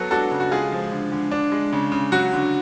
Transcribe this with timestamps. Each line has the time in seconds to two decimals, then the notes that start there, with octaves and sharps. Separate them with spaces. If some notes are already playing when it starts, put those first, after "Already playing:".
Already playing: F#3 B3 F#4 A4
0.11 D4 F#4 A4
0.31 C#3
0.40 F#4
0.51 G#3 F4 G#4
0.72 F3
0.92 D3
1.12 D3
1.31 D4
1.52 G#3
1.73 C#3
1.92 C#3
2.12 F#3 F#4
2.33 D3